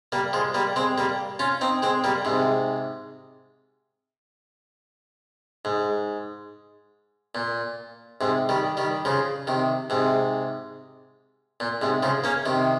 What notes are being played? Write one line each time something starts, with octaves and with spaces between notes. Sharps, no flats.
G3 A#3
F3 G#3
G3 A#3
G#3 C4
G3 A#3
C#4 F4
C4 D#4
G#3 C4
G3 A#3
G#2 C3
G#2
A#2
G#2 C3
D#3 G3
D#3 G3
C#3 F3
C3 D#3
G#2 C3
A#2
G#2 C3
C#3 F3
A#3 C#4
C3 D#3